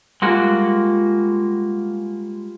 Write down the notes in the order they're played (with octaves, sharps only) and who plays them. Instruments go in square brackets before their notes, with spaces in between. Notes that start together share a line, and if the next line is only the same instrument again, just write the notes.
[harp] G3 F4 [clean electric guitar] G#3 A#3 F#4